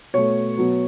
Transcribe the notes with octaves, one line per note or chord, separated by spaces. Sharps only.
B2 A3 C#5
B2 F#3 B3